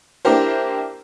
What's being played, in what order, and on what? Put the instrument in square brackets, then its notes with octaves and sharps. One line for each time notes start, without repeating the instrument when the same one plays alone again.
[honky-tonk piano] A#3 D4 E4 G4 A#4 C5